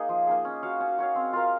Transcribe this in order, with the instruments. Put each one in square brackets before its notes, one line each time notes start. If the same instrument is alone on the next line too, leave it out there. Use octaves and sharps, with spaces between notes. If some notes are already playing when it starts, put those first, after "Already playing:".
Already playing: [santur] A#3 D#4 G#4
F3
A#3 D#4 G#4
C#4
F#4 C#5 F5
C#4
F#4 C#5 F5
C4
F4 A#4 F5